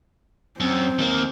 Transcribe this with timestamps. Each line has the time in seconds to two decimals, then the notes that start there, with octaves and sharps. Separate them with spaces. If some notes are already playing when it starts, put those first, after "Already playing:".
0.60 F#2 C4
0.99 D#2 A#3